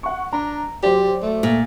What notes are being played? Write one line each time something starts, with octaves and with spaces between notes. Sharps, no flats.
F#5 C#6
D4 A#5
F#3 G4 C5 D5
A3
A#2